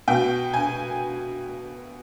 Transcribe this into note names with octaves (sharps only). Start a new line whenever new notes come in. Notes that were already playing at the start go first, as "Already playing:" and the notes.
B2 G5
G#5